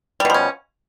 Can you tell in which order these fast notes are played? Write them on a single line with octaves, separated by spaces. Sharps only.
G3 B2 F3 C#4